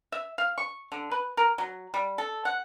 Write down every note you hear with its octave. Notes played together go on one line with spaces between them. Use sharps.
E5
F5
C#6
D3
B4
A#4
F#3
G3
A4
F#5